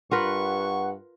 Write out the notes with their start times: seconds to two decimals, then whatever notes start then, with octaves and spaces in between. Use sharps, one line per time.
0.11 G2 F4 A#4 B4 F#5 C#6